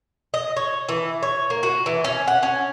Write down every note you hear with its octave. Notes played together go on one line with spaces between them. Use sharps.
D#5
C#5
E3
C#5
A#3
F#4
E3
C#4
F#5
C#4